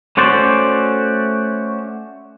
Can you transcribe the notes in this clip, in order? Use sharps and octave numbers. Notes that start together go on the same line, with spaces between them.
A3 C#4 F#4 C5 D5